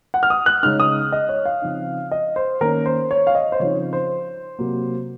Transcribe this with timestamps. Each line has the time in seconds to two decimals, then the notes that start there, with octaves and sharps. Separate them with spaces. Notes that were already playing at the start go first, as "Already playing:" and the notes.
0.14 F#5
0.23 F6
0.30 D#6
0.46 F#6
0.63 C#3 G#3 D#4 F6
0.80 D#6
1.12 D#5
1.29 C#5
1.46 F5
1.62 C#3 F3 C4 D#4
2.11 D#5
2.36 C5
2.61 D#3 A#3 C#4 A#4
2.86 C5
3.11 C#5
3.27 F5
3.35 D#5
3.52 C5
3.60 C#3 F3 C4 D#4 C#5
3.93 C5
4.59 C3 F#3 A#3